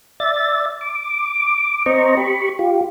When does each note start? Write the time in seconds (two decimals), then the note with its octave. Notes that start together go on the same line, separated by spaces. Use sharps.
0.20 D5 E5 A6
0.81 D6
1.86 C4 C5 D#5 A#5 C#6
2.17 G4 B5 C#6
2.59 F4 G4